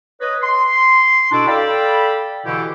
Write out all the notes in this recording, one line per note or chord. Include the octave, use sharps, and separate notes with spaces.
B4 C#5 D#5
C6
B2 D4 E4 A4 D6
A4 D5 F5 G5 B5
B2 D3 E3 E4 G4